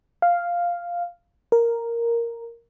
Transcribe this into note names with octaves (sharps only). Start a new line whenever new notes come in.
F5
A#4